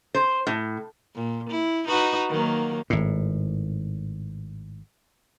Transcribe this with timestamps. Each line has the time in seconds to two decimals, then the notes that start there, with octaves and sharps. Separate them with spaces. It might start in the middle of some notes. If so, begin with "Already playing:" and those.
0.15 C5
0.47 A2
1.15 A#2
1.50 E4
1.88 D#4 F#4 B4
2.30 D#3 F#3 A#3
2.90 G#1 A2